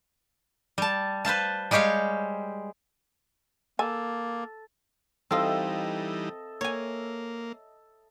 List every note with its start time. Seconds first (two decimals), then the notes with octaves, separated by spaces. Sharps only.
0.78 G3 A5
1.25 B4 C5 F5 A5
1.71 G3 G#3 G4 C#5 F5
3.79 A#3 A4 G#5
5.31 E3 G3 C4 D#4 F4 A4 D#5 E5
6.61 A#3 C#5 G#5